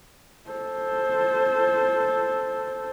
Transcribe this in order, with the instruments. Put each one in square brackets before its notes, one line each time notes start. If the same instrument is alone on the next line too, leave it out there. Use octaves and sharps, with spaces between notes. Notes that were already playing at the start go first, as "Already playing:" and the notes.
[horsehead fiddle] A4 C5